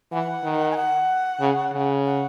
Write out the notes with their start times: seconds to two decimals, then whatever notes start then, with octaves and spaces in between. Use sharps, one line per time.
0.12 E3 F#5
0.44 D#3
0.71 G#5
0.77 F#5
1.40 C#3
1.73 C#3
2.05 F#5